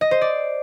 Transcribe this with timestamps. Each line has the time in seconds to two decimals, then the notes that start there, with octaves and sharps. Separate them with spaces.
0.01 D#5
0.11 C5
0.21 D5